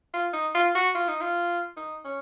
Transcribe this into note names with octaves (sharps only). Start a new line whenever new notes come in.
F4
D#4
F4
F#4
F4
D#4
F4
D#4
C#4